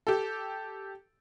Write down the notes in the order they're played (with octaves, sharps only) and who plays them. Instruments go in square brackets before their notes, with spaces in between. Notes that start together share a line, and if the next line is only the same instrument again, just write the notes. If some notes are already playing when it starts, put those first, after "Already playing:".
[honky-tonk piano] G4 A4